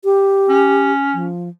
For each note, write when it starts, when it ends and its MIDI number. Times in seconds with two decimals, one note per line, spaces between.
0.05 0.92 67
0.49 1.30 61
1.14 1.49 53